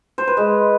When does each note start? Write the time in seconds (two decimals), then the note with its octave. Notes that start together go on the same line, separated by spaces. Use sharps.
0.18 C5
0.27 B4
0.37 G#3